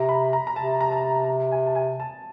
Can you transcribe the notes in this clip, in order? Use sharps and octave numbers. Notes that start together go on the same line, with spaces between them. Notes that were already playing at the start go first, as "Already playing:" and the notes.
Already playing: C3 A#5
B5
A#5
A#5
C3 A5
A#5
A5
G#5
A5
G#5
A5